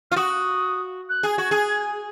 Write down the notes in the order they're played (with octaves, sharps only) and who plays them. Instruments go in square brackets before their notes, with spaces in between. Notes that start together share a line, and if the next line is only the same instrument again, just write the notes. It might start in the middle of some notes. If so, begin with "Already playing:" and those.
[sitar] F4 [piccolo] F6
[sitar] F#4 [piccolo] D#6
[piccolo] F#6
[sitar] G#4
[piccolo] G#6
[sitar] F#4
G#4